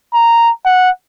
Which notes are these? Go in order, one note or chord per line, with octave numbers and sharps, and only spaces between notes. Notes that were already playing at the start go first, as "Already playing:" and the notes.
A#5
F#5